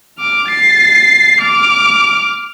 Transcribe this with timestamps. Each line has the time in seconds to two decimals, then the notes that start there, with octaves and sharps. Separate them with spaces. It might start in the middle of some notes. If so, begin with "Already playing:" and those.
0.19 D6 F6
0.50 A6 C7
1.41 D6 F6